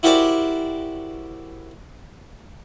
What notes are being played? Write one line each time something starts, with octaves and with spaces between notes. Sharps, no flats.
E4 F#4 G4 A#4 C5 D5